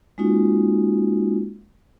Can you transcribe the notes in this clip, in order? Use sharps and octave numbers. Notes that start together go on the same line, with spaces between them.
G#3 A#3 C#4 D#4 F4 F#4